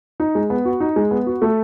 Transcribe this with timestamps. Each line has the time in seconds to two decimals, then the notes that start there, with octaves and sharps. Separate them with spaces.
0.20 D#4
0.35 G#3
0.50 B3
0.65 F#4
0.80 D#4
0.96 G#3
1.11 B3
1.26 F#4
1.42 A3